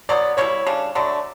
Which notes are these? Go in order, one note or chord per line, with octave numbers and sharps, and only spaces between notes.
B2 F#3 B3 D5
B2 G3 C#4 E4 C#5
C#3 G3 D4
D3 F#3 A3 D5